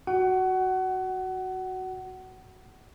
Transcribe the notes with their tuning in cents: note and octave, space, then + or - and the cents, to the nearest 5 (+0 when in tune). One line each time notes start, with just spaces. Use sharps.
F#4 +0 F#5 +25